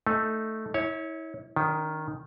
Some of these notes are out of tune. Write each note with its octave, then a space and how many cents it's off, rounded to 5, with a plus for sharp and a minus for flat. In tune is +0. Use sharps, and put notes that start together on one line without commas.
A3 +0 D#4 +0
E4 -35 C#5 +0
D#3 +0 D4 -40